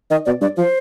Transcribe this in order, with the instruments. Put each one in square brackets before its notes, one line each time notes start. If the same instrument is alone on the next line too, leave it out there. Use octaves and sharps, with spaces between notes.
[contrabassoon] D#3 [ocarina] D#5
[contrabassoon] B2 [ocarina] D5
[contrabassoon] G2 [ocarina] D5
[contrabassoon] F3 [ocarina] C5